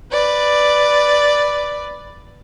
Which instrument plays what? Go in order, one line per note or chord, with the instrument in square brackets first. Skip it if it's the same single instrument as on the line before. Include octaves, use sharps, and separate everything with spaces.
[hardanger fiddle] B4 D5